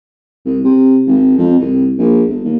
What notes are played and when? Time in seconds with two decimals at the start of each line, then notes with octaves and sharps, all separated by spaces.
0.45 C2
0.64 C3
1.07 G#1
1.38 F2
1.59 C2
1.98 A#1
2.28 G1
2.45 D#2